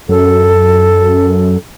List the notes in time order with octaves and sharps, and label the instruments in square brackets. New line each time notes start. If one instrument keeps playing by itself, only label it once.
[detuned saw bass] F#2 [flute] A4